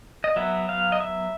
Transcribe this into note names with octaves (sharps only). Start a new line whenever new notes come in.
D#5
F#3 B3 E5
F5
D#5
E5